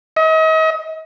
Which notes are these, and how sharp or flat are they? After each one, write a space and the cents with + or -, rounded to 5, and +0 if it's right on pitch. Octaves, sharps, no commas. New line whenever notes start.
D#5 +40